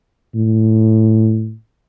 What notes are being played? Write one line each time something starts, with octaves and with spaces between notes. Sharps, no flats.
A2